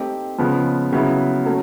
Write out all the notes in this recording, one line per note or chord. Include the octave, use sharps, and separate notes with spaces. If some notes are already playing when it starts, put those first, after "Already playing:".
Already playing: A3 C4 D#4 G4 C5
C#3 F3 G#3 B3
C#3 F#3 B3 E4
F#3 A3 C#4